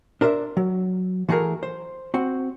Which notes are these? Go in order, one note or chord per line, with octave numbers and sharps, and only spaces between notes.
D4 A#4 C5 D5 E5
F#3
E3 A3 F#4 G#4 A#4
C5
C4 F#4